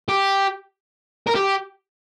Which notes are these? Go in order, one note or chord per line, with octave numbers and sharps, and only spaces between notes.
G4
A#4
G4